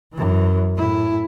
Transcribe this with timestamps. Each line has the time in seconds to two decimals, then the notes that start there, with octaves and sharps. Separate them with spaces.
0.13 F#2 E3
0.76 A2 E4